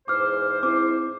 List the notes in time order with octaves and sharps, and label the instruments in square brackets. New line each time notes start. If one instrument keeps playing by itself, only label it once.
[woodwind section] E2 G#2 C5 [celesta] D6 F6
[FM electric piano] C4 E4 [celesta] D6